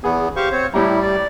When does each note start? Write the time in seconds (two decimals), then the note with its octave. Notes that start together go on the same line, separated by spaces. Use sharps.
0.04 E2 B3 G#4
0.36 G4 C5 F5 C#6
0.52 C4 C#5
0.74 A2 G3 E4 G4 A#5
1.02 D5